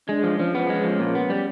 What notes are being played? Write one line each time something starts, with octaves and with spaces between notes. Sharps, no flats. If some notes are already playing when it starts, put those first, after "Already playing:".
G#3 D4
F3
F3 C#4
B3
G#3
F3
A#2
B3
G3